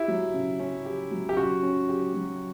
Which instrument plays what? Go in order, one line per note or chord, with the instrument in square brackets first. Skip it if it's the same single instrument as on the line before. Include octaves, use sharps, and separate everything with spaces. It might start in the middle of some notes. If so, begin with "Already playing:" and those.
Already playing: [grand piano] E4 [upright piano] G4
[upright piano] F#3
C#3
C#4
G4
F#3
[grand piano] G4
[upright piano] C#3 [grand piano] F#4
[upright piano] C#4
G4
F#3